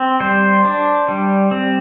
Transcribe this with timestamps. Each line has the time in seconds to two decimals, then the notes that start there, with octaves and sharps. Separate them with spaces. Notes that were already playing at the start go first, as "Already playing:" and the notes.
Already playing: C4
0.20 G3 C5
0.65 D4
1.08 G3
1.51 C4